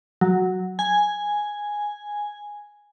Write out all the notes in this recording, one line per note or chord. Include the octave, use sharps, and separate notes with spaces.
F#3
G#5